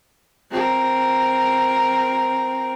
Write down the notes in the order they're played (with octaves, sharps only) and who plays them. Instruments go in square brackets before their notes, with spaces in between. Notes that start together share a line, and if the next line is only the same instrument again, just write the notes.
[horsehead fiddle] C4 A#4